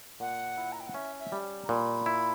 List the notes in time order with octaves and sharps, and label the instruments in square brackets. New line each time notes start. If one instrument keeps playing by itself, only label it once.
[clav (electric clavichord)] A#2 [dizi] F#5
[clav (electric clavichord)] E4
[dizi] A#5
G5
F#5
[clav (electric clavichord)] C#4 [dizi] E5
[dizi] E5
[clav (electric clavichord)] G3
[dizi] A#5
[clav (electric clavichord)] A#2 [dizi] B5
[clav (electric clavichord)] E4